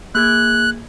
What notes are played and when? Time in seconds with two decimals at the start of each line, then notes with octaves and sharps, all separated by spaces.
0.15 A#3 G#4 F#6 G#6